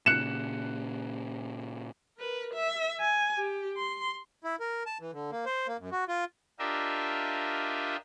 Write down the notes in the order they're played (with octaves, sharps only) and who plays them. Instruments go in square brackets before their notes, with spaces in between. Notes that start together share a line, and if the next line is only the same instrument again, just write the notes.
[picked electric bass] A#2 C#3 [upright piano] F#6 C#7 E7
[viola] A#4 B4
E5
G#5
G4
C6
[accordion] E4
A#4
A5
E3
D3
A#3
C5
A#3
F#2
F#4
F4
[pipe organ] D4 F4 G4 A#4 D#5 E5